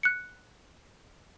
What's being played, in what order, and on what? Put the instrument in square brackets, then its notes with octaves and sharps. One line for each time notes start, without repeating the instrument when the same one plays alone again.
[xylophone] F#6 C#7